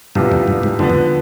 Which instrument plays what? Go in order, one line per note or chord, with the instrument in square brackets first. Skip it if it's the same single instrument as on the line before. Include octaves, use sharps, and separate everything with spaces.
[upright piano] C2 C3 G3 B3 F4 [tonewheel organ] G2
[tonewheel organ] F2
G2
G#2
[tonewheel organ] G2 [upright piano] D3 F3 B3
[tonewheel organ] F2